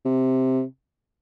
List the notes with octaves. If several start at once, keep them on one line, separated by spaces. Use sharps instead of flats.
C3